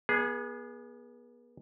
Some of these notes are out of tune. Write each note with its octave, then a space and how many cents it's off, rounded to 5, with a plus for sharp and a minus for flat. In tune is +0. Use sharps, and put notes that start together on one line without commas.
B3 -35 G#4 +0